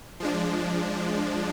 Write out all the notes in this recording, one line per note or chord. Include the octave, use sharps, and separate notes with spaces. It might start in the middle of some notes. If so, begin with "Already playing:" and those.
F3 G#3 D4